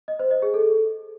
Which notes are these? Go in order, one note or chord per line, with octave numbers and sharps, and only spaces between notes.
D#5
C5
D#5
G#4
A4